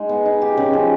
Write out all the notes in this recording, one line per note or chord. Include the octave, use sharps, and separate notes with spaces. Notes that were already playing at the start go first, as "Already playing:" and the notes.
Already playing: G#3 D#4
B3
D#4
G4
C#3
F3